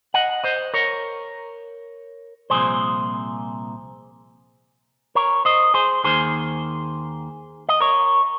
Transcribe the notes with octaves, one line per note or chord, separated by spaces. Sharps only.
D#5 F#5
C5 D#5
A#4 C#5
C2 A#2 F3 C4 G#4 C5
A#4 C#5
C5 D#5
G#4 C5
D#2 D#3 A#3 G#4 C5
D#5
A#4 C#5